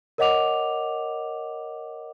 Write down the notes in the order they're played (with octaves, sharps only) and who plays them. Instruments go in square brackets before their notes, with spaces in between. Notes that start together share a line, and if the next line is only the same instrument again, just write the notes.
[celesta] A#4 C#5 D#5 F#5 D6 F7